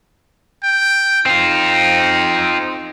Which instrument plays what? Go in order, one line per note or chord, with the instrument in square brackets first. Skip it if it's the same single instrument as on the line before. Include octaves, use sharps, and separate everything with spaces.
[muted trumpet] G5
[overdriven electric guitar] C4 F4 [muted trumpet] D#4